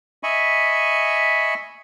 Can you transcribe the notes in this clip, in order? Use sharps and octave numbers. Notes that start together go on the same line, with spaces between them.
D#5 E5 G#5 B5 C#6